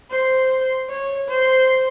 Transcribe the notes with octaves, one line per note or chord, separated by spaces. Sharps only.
C5
C#5
C5